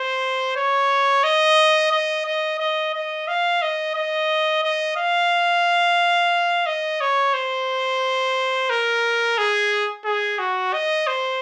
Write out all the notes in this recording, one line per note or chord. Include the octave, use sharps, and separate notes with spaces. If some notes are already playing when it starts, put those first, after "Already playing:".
Already playing: C5
C#5
D#5
D#5
D#5
D#5
D#5
F5
D#5
D#5
D#5
F5
D#5
C#5
C5
A#4
G#4
G#4
F#4
D#5
C5